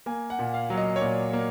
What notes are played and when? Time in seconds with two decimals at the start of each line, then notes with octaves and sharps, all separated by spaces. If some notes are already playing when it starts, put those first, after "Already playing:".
0.06 A#3 G#5
0.30 F#5
0.39 A#2
0.54 F5
0.70 F#3
0.77 D#5
0.96 C#5
1.01 A#2 D5
1.33 A#3